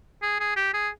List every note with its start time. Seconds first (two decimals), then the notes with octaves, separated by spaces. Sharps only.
0.23 G#4
0.40 G#4
0.56 G4
0.74 G#4